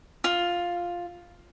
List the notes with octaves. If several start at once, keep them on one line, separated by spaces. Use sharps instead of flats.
F4